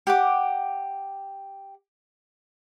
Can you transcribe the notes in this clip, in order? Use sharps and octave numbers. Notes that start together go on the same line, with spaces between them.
G4 F#5 D6